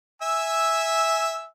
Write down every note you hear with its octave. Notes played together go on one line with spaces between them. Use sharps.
E5 G#5 E6